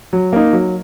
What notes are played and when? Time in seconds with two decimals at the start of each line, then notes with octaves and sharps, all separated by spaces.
0.13 F#3
0.33 A#3 D#4
0.53 F#3